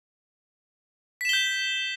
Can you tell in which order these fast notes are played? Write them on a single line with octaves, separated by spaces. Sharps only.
B6 E7 G7 G6